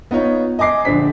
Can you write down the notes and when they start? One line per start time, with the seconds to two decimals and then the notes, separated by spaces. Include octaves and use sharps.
0.11 B3 D#4 F4 C#5
0.59 D#5 G#5 D6 C7
0.85 A#1 D3 D4 C5 B6